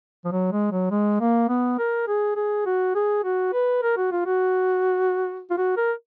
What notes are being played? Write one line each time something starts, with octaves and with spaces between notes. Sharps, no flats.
F3
F#3
G#3
F#3
G#3
A#3
B3
A#4
G#4
G#4
F#4
G#4
F#4
B4
A#4
F#4
F4
F#4
F4
F#4
A#4